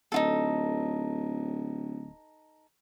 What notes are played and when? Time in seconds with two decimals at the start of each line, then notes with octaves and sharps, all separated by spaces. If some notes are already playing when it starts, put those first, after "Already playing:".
0.12 D1 D#4 F4 A4